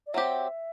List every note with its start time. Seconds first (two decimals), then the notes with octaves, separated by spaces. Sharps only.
0.07 D5
0.14 F#3 C4 G4 E5